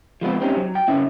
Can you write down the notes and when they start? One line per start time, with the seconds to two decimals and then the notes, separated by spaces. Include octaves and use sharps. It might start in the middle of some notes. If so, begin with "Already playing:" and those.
0.21 F3 G#3 B3 C4
0.41 C4 C#4 D#4 G4
0.57 F#3
0.75 G5
0.88 C#3 C#4 E4